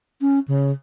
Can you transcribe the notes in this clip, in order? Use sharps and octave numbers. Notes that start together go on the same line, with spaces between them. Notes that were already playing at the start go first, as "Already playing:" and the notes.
C#4
C#3